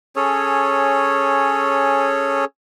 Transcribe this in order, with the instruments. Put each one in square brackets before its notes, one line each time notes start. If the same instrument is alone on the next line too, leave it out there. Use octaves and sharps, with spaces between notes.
[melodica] C#4 G#4 A4 C#5